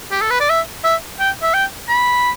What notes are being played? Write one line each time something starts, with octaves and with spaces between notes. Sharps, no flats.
G4
A4
B4
D5
E5
E5
G5
E5
G5
B5